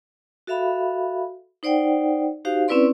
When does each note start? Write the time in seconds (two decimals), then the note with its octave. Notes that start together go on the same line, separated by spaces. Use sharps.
0.47 F#4 A4 E5 F5 B5
1.63 D#4 C5 D5 F#5 G5
2.45 D#4 F#4 G4 C5 F5
2.68 C4 C#4 E4 B4 D5 C6